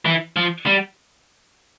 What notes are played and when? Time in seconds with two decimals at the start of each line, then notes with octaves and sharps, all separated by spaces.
0.06 E3
0.36 F3
0.66 G3